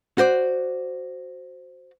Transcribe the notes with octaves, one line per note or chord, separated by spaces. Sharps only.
F#4 C5 D5